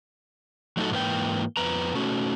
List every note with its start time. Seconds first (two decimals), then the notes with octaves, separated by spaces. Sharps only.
0.77 F#3 A3 D#4 F#4 A4
0.91 G#2 E3 A#3 B4 G5
1.57 F2 B3 B4 A#5
1.95 A3 C#4 F#4